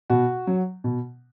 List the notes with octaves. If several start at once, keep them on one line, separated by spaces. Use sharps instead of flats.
B2 F#4
F#3
B2